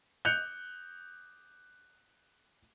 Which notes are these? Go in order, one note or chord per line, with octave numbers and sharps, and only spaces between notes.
F#6 G6 C#7 F7